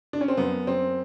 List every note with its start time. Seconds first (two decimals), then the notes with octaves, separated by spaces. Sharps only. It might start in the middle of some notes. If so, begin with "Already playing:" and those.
0.13 D4
0.21 C#4
0.28 C4
0.37 F#2 B3
0.67 F#2 C4